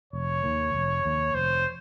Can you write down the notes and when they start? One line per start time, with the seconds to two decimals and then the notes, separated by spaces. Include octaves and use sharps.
0.13 F1 C#5
0.43 D#2 D#3 A#3
0.74 F1
1.05 D#2 D#3 A#3
1.34 F1 C5